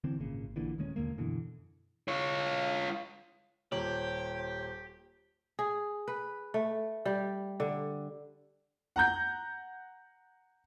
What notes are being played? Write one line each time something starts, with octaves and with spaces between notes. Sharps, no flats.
D3 E3 C4
G#1 A#2 C#3
A#1 A#2 D3 E3
D#1 D#3 G#3 C#4
D#2 D3 G#3 A#3
F#2 B2 D3 E3
F4 C#5
D#1 G4 C5 C#5 F#7
G#4
B4
A3
G3
D3
F#5 A#5 G6